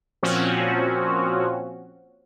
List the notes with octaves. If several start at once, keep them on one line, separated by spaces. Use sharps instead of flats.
A#2 F3 C4 C#4 F#4